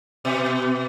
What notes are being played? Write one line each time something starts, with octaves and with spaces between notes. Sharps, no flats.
B2